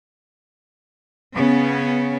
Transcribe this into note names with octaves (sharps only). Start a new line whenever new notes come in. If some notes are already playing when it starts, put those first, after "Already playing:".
C#3 B3 C#4